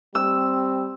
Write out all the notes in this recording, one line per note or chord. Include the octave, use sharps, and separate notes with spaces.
G3 C4 E6